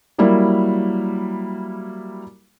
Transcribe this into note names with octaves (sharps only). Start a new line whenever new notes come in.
F#3 G3 A#3 E4